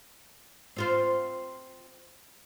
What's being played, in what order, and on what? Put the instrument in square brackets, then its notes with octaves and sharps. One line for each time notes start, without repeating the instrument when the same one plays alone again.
[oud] C4 F4 C5